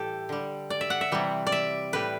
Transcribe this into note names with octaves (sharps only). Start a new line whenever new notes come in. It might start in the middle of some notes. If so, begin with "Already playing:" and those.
Already playing: A2 E3 G3 G4 A4
D3 G3
D5
E5
F#5
E5
C3 E3 G3
D5
E5
A2 G3 B4